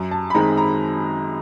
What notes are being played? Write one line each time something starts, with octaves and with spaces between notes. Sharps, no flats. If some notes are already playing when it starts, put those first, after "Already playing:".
Already playing: F#2
A5
B5
D#3 G#3 C4 D#4 A#5
A#5